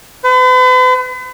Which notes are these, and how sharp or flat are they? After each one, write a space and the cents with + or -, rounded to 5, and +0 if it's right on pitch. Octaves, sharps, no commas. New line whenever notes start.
B4 +45